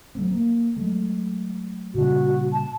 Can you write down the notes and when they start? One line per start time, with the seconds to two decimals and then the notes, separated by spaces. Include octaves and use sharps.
0.15 F#3 A3 C4
0.31 A#3
0.77 F#3 G#3 A3
1.95 A#2 C#3 G3 F#4
2.53 A5